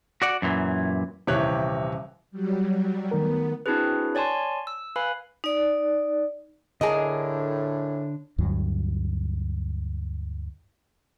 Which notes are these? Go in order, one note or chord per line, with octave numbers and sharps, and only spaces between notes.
F#4 D5 F#5
F#2 A#2 E3
D#1 C3 E3 G4 C#5 F#6
F#3 G3
D#3 A3 B3 A#4
C4 D4 E4 F#4 G#4 B4
C#5 D5 G#5 A5 C6
E6
B4 F5 G#5 B5
D#4 D5
A2 D3 D4 G#4 A#4 D#5
D2 G2 F#3